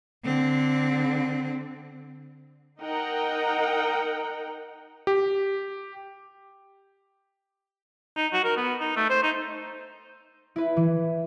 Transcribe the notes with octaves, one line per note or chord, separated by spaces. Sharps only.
D3 C4
D#4 A#4 D#5 F#5 G5 A#5
G4
D#4
F#4
A#4
B3
D#4
A3
C5
D#4
E4 B4
E3